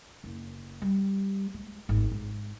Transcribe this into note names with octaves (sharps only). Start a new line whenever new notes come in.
F#1
G3
G#3
G#1
G#2